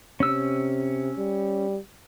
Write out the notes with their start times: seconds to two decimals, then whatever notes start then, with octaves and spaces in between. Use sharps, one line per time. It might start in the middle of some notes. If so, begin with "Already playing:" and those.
0.20 C3 C#4 E6
1.18 G3